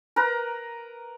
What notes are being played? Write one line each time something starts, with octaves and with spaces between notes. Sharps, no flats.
A#4 B4 A#5